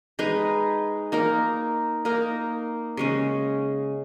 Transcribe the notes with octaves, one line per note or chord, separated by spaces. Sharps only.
G#3 D#4 G#4 B4
A#3 D#4 A#4
A#3 D#4 A#4
C#3 G#3 C#4